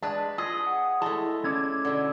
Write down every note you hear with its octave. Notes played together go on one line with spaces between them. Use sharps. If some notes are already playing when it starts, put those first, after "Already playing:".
G#3 D4 B4 A5
F4 G#4 D#5
F#5
G#3 A3 E4 A5
C#4 E4 D5 G#6
B2 D3